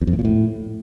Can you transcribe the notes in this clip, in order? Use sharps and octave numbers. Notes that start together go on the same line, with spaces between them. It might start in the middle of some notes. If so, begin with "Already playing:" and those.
E2
F2
A2
A#2
A2